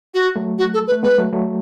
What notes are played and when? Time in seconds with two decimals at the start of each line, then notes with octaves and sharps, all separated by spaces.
0.14 F#4
0.36 F#3 A3
0.58 F#4
0.74 A4
0.88 B4
0.92 A3
1.03 G#3 B3 B4
1.18 F#3 A3
1.33 F#3 A3